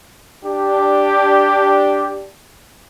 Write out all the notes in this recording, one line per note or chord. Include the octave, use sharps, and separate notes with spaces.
D4 G4